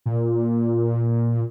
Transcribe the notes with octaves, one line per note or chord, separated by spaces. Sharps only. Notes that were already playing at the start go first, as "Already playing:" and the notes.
A#2